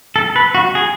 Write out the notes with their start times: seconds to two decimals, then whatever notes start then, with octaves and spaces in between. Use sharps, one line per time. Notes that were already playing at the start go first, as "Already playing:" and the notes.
0.16 A4
0.36 B4
0.55 F#4
0.75 G#4